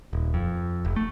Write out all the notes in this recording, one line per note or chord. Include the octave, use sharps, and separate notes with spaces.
D#1
F2
F1
A3